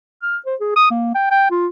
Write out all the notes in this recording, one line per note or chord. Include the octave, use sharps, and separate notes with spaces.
F6
C5
G#4
D#6
A#3
G5
G5
F4